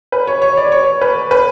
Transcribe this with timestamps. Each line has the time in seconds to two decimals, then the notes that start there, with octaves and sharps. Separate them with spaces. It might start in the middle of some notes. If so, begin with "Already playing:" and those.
0.12 B4
0.27 C#5
0.42 C#5
0.57 D5
0.72 C#5
1.01 B4
1.31 B4